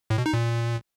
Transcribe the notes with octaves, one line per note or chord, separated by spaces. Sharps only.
A2
B2
D#4
A#2